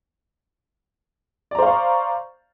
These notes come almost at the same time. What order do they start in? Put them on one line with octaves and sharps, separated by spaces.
D5 A#5 C5 F5 C#6